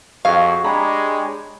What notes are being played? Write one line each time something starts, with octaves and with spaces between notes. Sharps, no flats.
F2 F#4 G#4 F5
G#3 D4 G4 C#5 A#5 B5